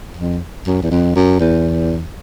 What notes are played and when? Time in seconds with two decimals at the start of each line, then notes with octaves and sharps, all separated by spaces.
0.17 F2
0.67 F#2
0.82 E2
0.91 F2
1.15 F#2
1.40 E2